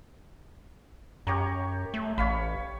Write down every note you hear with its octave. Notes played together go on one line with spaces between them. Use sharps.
F#2 G4 C#5 A#5
A3
A1 C#5 F5 B5